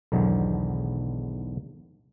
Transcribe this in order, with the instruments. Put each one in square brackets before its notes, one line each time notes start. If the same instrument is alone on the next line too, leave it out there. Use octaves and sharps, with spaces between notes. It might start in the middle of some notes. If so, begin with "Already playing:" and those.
[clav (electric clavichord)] B1 E2 G#2 D3 D#3 F#3